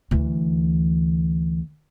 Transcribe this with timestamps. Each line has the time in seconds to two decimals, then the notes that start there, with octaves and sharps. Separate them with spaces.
0.11 D2 E3